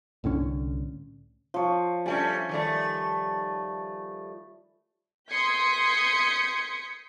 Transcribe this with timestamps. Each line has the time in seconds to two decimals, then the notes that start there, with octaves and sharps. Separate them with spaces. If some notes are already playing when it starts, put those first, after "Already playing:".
0.24 C2 A2 D3 C#4
1.54 F3 C#5
2.06 G3 A3 C#4 G#5
2.49 D#3 G3 A3
5.30 C6 D#6 G6 G#6 B6 C#7